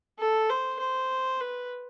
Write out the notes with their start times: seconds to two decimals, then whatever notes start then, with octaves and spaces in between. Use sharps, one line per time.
0.19 A4
0.50 C5
0.79 C5
1.41 B4